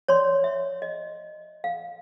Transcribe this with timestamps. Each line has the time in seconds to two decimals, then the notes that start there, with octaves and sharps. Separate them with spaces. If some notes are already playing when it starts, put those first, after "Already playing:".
0.08 C#5 D5 C6
0.44 E5
0.82 D#5
1.64 F5